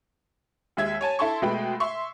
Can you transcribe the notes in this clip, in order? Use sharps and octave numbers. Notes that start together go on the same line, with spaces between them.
D#2 G#3 E5 G#6
C#5 G#5 A5
E4 A4 A5 C6 C#6
B2 G#3 A3 B4 G5 B5
E5 C6 C#6